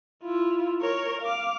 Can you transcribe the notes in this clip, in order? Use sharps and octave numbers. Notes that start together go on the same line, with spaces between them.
E4 F4
A#4 C#5
F5 D6